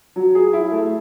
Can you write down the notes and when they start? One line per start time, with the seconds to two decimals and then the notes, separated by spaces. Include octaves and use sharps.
0.16 F#3
0.35 G#4
0.53 E4
0.72 A3